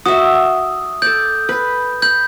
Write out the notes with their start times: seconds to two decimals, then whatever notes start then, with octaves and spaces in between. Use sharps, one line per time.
0.06 F#4 E5 D#6
1.02 A4 D5 G6
1.49 B4
2.02 B5 G6